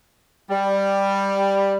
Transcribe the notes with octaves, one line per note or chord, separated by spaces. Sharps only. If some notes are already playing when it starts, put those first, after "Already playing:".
G3